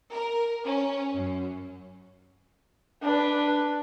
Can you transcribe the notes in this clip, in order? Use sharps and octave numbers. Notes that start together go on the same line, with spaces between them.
A#4
C#4
F#2
D4 B4